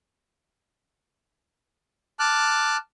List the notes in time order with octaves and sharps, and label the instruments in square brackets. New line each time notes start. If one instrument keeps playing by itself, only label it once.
[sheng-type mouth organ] A5 D6 F6 F#6